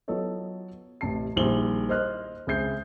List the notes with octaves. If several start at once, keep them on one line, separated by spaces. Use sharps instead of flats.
F#3 B3 F4 A4 C#5 D#5
A1 C3 A5 C7
A#1 D#3 G3 C5 F#7 G7
C5 D#5 F6 F#6
C#2 C4 G#4 E5 G6 C7